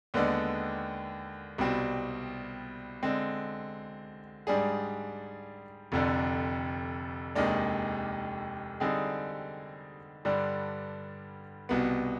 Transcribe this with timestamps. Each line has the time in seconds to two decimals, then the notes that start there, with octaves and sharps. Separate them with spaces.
0.14 D#2 D3 G#3 B3 D4
1.58 C2 B2 G3 C4
3.03 D3 G#3 C4
4.47 G#2 G3 D4 G#4
5.92 F1 F2 D3
7.35 F1 D#2 D#3 G#3 D4
8.80 D3 G3 C4 D#4 G#4
10.25 G2 D3 G3 D4
11.69 C2 B2 B3